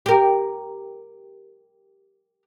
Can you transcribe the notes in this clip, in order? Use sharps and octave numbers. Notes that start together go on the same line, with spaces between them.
G4 A#4